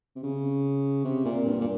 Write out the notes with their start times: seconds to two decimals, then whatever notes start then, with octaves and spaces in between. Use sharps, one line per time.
0.15 C3
0.24 C#3
1.05 C3
1.25 A#2
1.45 G2
1.61 A#2